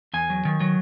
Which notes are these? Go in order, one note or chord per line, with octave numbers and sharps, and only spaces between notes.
E2 G#5
F#3
D#3
F#3